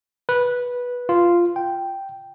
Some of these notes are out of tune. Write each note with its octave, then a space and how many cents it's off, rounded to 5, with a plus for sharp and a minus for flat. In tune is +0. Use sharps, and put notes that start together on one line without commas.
B4 -10
F4 -5
G5 -5